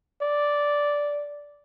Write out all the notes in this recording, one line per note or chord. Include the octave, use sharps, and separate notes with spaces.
D5